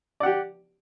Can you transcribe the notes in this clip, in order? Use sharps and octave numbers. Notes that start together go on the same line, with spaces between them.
G4 D5 F#5